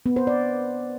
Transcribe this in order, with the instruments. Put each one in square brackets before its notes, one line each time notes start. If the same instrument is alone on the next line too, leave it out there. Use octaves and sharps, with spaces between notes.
[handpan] B3
C5
D5